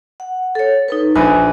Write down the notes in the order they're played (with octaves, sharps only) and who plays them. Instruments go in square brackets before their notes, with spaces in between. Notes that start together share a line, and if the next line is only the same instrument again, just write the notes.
[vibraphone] F#5
A4 C#5
D#4 A4 B4
[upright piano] A#1 B4 [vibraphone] G#5